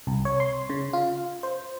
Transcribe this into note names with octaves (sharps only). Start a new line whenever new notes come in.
C2
C#5
C6
C#3
F4
C5